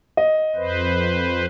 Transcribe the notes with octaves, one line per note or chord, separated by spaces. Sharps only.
D#5
F2 B4 C5